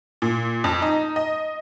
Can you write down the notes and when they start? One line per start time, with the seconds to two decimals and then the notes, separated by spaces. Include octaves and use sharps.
0.22 A#2
0.64 F2
0.82 D#4
1.16 D#5